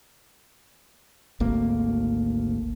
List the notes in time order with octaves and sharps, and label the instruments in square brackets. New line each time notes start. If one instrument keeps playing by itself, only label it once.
[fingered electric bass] G#1 D2 A#3